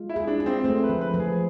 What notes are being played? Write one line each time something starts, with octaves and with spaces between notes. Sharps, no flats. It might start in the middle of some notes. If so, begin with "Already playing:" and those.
Already playing: G#3 F4
E4
G#4
D4
G#4
C4
A3 C4
B4
F3
B4
F3
G#4